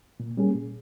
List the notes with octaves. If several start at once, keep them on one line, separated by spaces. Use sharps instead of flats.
A#2
G3 A#3 C#4 G#4
A#2